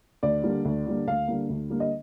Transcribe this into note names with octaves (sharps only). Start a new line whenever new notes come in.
D2 D5
D3 G3 A#3
D2
D3 G3 A#3
D2 F5
D3 G3 A#3
D2
D3 G3 A#3
D#5